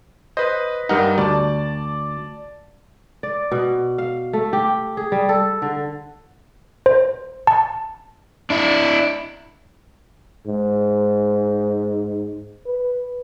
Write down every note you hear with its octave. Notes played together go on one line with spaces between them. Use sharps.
B4 C5 D#5
G2 G3 D#4 A#4 F#5
D2 D5 A5
D5
B2
F5
A3
G4
G#4
G3
A4
D3
C5
A5
D4 E4
G#2
B4